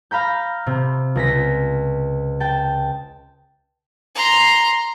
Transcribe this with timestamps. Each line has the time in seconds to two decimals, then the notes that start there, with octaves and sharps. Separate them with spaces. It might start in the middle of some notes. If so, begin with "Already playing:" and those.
0.11 F5 A#5 B5 G6
0.66 C3
1.15 C#2 A#6 B6
2.40 G5 A5
4.15 A#5 C6